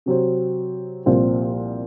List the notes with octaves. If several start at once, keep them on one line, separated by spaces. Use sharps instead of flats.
C3 F#3 C4
C2 A#2 F3 C4 F4